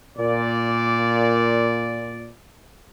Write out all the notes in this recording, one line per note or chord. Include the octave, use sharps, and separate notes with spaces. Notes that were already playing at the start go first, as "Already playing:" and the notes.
A#2 D5